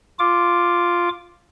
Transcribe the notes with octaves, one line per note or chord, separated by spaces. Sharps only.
F4 D6